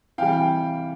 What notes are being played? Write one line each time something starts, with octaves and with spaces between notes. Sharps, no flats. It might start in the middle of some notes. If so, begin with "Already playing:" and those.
C3 E3 G3 F5 G5
G5